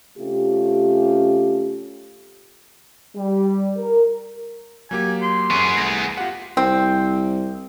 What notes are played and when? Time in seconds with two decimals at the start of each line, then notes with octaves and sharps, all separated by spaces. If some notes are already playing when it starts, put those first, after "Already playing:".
0.19 C3 A3 C#4 F4 G4
3.15 G3
3.76 A#4
4.91 F#3 A#3 G4 G#5
5.22 C6
5.50 F#2 B3 G#4 C#6
5.77 C2 A3 A#6
6.17 F4 G4 F#5
6.57 C2 C4